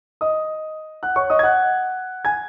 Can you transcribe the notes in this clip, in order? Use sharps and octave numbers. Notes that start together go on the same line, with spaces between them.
D#5 D#6
F#5 F#6
C#5 C#6
D#5 D#6
G#6
F#5 F#6
G#5 G#6